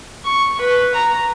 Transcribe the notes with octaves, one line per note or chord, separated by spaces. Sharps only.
C#6
B4
A#5